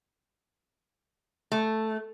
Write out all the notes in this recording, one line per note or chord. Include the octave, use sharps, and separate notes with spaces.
A3